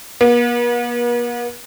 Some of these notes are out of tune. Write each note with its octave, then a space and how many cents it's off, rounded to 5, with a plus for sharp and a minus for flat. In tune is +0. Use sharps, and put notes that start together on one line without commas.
B3 -45